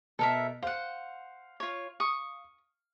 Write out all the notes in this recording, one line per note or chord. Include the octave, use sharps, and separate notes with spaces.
B2 A4 A#4 E5
C5 F5 F#5
F4 C#5
C#6 D#6